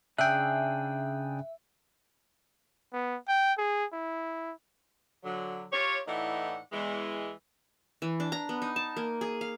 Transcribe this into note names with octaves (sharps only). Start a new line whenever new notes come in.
C#3 D4 G#4 E5 G5 F#6
B3
G5
G#4
E4
D3 F#3
F4 G4 C#5
A2 E3 D#4 D5 F#5
E2 E3 G#3
E3
D4
A#5
B3
D#4
A5
A#3
G#4
F5